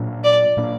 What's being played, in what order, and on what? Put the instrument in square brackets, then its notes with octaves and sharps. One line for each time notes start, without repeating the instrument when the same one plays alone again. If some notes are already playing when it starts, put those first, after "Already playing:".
Already playing: [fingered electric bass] A#2 F#3 A#3 D4
[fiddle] D5
[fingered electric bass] A#2 F#3 A#3 D4